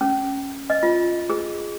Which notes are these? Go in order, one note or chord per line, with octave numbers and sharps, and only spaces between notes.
C#4
D#5
F4
G#4